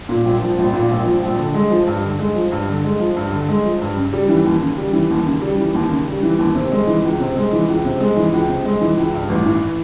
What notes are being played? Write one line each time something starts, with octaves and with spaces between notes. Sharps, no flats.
A#2
A#1
F3
A#1
A#2
A#1
F3
A#1
D3
G#3
F3
G2
D3
G#3
F3
G2
D3
G#3
F3
G2
D3
G#3
F3
G2
C#3
G3
E3
D#2
C#3
G3
E3
D#2
C#3
G3
E3
D#2
C#3
G3
E3
D#2
C3
G#3
E3
C#2
C3
G#3
E3
C#2
C3
G#3
E3
C#2
C3
G#3
E3
C#2
G2
A1
E3